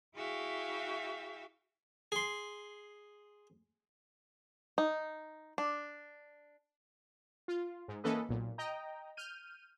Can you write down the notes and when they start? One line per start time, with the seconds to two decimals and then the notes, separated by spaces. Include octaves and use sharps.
0.15 E4 F#4 G#4 E5 F5 G5
2.12 G#4 C6
4.78 D#4
5.58 D4
7.48 F4
7.88 G#2
8.04 E3 A#3 C#4 A4 B4 D#5
8.29 B1 A#2
8.58 D#5 G5 A#5
9.17 F6 G6 D#7